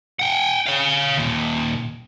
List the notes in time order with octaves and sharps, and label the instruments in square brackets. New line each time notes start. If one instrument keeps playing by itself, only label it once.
[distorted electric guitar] F#5 G5
C#5 F5
D#2 A#2